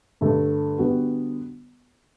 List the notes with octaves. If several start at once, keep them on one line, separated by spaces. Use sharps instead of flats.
G2 D3 A3
D3 G3 B3 F#4